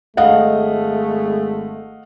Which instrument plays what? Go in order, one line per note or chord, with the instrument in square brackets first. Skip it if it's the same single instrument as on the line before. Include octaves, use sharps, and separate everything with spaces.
[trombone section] G#1 G#3 A3 [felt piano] D#5 F5 F#5